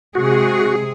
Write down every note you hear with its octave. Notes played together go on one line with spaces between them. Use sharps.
C3 G#3 F#4 G#4